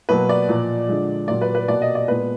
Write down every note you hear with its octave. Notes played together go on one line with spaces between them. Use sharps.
B2 F#3 A#3 B4
D5
A#2 F3 A#3
D3 F3 G#3
A#2 F#3 A#3 D5
B4
B4
B2 A#3 D5
D#5
D5
A#2 G#3 B3 B4